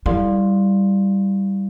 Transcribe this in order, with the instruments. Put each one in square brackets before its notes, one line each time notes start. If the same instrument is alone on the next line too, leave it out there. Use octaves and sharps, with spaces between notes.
[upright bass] G3 [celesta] E4 A4 D5 F5 C6